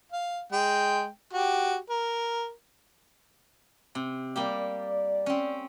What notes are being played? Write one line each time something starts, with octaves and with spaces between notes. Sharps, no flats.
F5
G#3 G5
F#4 G4
A#4
C3
G3 A#3 G4 D5
C4 C#4